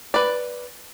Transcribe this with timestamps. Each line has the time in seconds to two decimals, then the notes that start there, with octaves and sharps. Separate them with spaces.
0.14 B4 D5